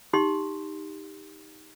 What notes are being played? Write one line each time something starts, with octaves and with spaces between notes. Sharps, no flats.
D#4 G4 C6